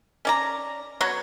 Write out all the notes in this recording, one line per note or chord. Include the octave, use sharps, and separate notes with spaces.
C#4 D5 A#5
F#3 B3 F#4 C#5